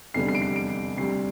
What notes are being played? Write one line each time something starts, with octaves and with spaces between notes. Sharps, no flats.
F1 E2 D3 G3 C7
C7
D7
C7
D7
D2 C3 G3 C7